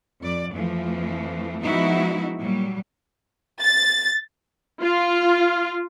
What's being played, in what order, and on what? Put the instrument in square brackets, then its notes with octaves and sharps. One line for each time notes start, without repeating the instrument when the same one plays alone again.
[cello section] F2 D5
F2 E3 F3 A3
F3 G#3 B3 D#4 E4 F#4
A#2 F#3 G3
[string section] A6
[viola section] F4